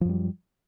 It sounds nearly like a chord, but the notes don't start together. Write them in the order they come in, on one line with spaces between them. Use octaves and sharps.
F3 F#2 G3